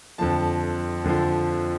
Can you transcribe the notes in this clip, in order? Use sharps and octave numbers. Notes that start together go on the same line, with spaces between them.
F2 D3 F3 A5
F2 D3 F3